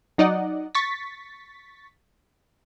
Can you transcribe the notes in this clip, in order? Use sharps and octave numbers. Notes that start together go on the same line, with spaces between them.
F#3 D#4 D5 D#5 F#5
C#6 A6 B6